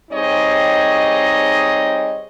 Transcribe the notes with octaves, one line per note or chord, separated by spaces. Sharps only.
G3 C4 D#4 G#4 C#5 D#5